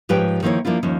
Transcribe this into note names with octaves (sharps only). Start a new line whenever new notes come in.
G#2 F3 G4 B4 C#5 G5
D#3 F3 A#3 E4 C#5
F3 A#3 D4 E4 F4
D#2 F3 C#4